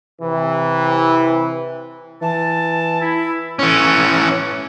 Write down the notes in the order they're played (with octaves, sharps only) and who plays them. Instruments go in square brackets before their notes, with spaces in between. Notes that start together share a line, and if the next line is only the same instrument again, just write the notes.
[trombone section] C3 E3
[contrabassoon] E3 [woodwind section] A5
[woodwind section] E4
[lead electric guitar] E3 C#4